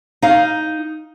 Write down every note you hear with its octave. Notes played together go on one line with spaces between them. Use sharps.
D#4 F5